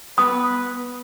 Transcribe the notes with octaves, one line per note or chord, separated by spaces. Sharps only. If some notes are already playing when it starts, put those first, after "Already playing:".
B3 B4 D#6